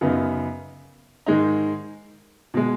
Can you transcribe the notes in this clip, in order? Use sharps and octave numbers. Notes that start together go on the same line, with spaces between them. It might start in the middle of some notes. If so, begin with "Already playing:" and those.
F#2 C#3 B3 D#4
G#2 D#3 G#3 D#4
B2 G#3